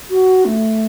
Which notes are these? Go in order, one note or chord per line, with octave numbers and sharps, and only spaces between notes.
F#4
A3